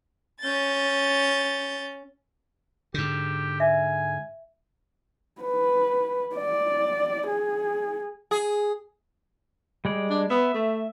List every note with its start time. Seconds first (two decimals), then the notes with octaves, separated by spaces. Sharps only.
0.41 C#4 G6 A6
2.94 G#2 D3 G4
3.60 E5 G#5
5.41 B4
6.35 D5
7.27 G#4
8.31 G#4
9.85 G3 G#3 D5
10.10 D4
10.30 B3 E5
10.54 A3